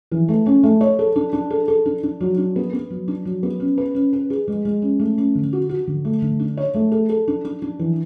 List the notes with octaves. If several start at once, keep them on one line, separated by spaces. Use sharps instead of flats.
E3
A3
C#4
A3
C#5
A4
D4
D4
A4
A4
D4
D4
F#3
D4
B3
B3
F#3
D4
F#3
B3
C#4
B4
C#4
B4
G#4
G#3
G#3
C#4
A3
C#4
D3
F#4
F#4
D3
A3
D3
D4
C#5
A3
A4
A4
D4
D4
D4
E3